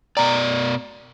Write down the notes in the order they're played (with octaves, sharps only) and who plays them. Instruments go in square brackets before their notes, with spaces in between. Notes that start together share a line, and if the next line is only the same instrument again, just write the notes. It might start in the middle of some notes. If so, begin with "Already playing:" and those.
[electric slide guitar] B2 D5 [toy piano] G5 A#5